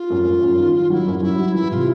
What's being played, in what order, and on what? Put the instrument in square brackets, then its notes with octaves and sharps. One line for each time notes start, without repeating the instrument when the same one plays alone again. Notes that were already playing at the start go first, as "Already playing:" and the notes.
Already playing: [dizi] F4
[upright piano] F#2
F#2
F#2
D#3
D#3
[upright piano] F#3 [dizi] E4
[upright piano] F#2
[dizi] F4
[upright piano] F#3 [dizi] E4
[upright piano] F#3
[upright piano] E3 [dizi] E4
[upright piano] C3 [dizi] F4